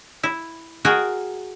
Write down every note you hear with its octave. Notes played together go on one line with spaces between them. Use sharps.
E4
F#4 G#4 A#4 D#5 G5 G#5